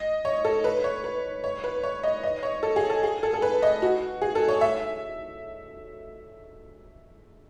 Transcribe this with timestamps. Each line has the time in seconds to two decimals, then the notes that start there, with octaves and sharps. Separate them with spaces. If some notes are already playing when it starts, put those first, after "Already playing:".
Already playing: D#5
0.25 C#5
0.44 A4
0.64 B4
0.84 C#5
1.04 B4
1.44 C#5
1.64 B4
1.83 C#5
2.03 D#5
2.23 D#5
2.43 C#5
2.63 A4
2.76 G#4
2.90 A4
3.03 G#4
3.23 A4
3.33 A4
3.42 B4
3.62 D#5
3.82 F#4
4.22 G#4
4.35 A4
4.48 C#5
4.61 E5